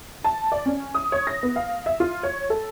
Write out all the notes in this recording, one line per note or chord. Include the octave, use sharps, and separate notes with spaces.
A5
D5
C#4
D#6
C#5
A#6
B3
F5
E5
F4
C#5
A4